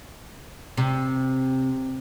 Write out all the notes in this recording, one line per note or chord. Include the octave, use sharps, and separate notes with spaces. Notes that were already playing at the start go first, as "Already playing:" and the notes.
C3